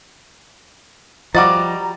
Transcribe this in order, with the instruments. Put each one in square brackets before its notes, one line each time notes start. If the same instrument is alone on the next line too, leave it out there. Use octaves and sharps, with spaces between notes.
[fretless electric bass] F3 [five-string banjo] G3 F#4 D#5 [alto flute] A#5 [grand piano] D6 A6